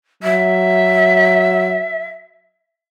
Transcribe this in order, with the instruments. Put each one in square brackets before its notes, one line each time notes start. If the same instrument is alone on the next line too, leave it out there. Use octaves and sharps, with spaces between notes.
[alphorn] F#3 [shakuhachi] E5